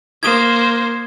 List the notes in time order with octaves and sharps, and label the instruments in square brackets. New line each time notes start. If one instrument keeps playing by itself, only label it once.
[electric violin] A#3 C5 [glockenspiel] D#6 G#6